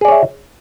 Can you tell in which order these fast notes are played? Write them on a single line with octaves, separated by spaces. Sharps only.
G#4 D5 C#5 E5